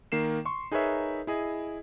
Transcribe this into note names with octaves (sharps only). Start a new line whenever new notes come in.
D#3 A#3 C7 E7
C6 C#6
D#4 G#4 A#4 B4 C#5 E5
E4 G#4 D#5